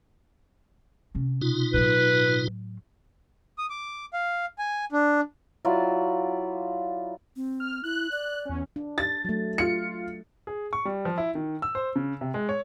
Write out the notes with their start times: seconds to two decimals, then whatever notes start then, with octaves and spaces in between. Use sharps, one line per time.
1.15 C3 C#4
1.41 B2 D#4 F4
1.74 A2 F#3 B4
3.58 D#6
3.70 D6
4.13 F5
4.59 G#5
4.92 D4
5.65 F#3 E4 F4 D5
7.36 C4
7.60 F6
7.84 E4 F#6
8.11 D5
8.45 E2 C#4
8.76 D4
8.98 A6
9.25 F#3 A3
9.58 F4 C#7
10.47 G#4
10.73 C#6
10.85 G3
11.05 F3
11.18 E4
11.35 D#3
11.62 E6
11.75 C5
11.96 C#3
12.21 C3
12.34 G#3
12.49 C#5